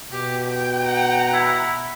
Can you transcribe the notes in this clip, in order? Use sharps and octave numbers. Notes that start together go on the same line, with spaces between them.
B2 G4
G5
F#5 A#5
E4